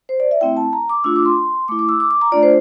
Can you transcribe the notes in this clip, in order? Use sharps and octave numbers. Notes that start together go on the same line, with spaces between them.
C5
D5
E5
A3 C4 E4 G5
A5
A#5
D6
A3 D4 F4 E6
D6
C6
A3 E4 D6
D6
E6
D6
D6
A#5
A3 D4 F4 D5
C5